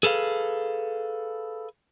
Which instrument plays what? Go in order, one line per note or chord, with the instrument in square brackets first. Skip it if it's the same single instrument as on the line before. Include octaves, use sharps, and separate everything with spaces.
[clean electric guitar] G#4 A4 B4 F5